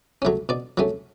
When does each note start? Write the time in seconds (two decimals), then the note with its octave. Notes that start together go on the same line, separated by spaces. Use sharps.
0.22 F#3 A3 C#4
0.49 B2 D5
0.78 F#3 A3 C#4